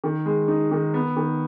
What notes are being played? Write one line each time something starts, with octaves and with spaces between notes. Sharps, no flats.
D#3
G#3
D#4
D#3
B3
D#3